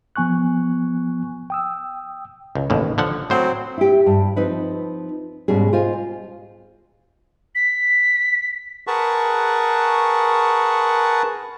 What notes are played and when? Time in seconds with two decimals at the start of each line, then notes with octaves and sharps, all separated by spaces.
0.16 F3 B3 G#5 C#6 F#6
1.50 G5 D#6 E6
2.55 C#2
2.70 A1 D#2 B2
2.98 D3 F3 F#5
3.30 A2 F#3 C4 C5
3.78 E4 G4
4.06 G2
4.36 F3 C4 D#4 B4
5.48 G#2 B2 G3 C#4 G#4
5.73 F4 C5 D#5 F5 G#5
7.55 B6
8.87 G#4 A#4 B4 F#5 A5 C#6